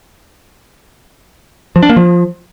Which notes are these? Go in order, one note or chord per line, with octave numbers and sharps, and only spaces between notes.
F3
D4
A#3
F3